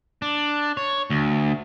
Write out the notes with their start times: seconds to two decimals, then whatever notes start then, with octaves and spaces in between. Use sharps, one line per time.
0.22 D4
0.77 C#5
1.10 D2